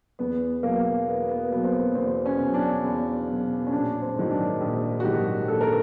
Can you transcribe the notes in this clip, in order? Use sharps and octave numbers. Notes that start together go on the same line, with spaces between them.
E2 B3
B2 F#3 A#3
E2 B3
B3
B2 F#3 B3
C4
B3
E2 C4
C#4
B2
F#3
D4
E2
B2 F#3
C#4
A#1 D4
C4
G#2 D#3 F#3
D4
A#1
F#4
G#2 D#3 F#3 G4
A#1 A4
A#4